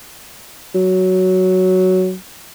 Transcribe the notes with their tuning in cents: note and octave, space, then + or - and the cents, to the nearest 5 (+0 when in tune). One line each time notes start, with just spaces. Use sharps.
F#3 +5